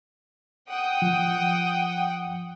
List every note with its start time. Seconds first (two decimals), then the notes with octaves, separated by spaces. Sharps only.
0.70 F#5 G5 D#6
1.02 F3